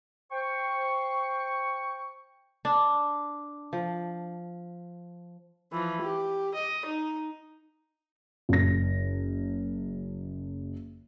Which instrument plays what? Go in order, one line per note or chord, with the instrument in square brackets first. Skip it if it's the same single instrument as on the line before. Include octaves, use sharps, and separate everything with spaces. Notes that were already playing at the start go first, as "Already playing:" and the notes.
[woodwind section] C5 G5 C#6
[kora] D4
F3
[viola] E3 F3
G4
D#5
D#4
[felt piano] F#1 A#6